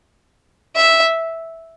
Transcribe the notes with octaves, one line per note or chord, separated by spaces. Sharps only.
E5